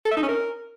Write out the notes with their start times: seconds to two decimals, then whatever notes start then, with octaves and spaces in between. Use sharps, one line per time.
0.05 A4
0.11 E5
0.17 D#4
0.23 C#4
0.28 A#4